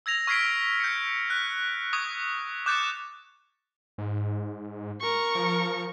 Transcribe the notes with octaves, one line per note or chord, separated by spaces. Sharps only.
E6 G#6 A#6 F7
C#6 F6 G#6 B6 C7 D7
G6 C#7
F#6 B6
C#6 D#6 G#6
D6 F#6 G6 A6 C#7 E7
G#2
A#4 C#6
F3